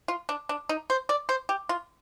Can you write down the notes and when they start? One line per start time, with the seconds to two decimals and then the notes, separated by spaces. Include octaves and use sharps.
0.08 F4
0.29 D4
0.49 D4
0.69 D#4
0.90 C5
1.09 D5
1.29 C5
1.49 G4
1.69 F4